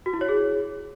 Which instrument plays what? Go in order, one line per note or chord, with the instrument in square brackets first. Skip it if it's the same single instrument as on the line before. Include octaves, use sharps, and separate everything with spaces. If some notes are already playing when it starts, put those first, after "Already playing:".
[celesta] F#4
E4
C#5
G#4